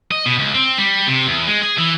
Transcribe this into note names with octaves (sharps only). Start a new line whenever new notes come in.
D#5
B2
C#2
C4
G3
C3
E2
G#3
G#4
E3